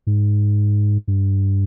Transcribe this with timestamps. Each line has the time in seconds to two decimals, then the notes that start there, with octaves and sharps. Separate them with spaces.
0.07 G#2
1.08 G2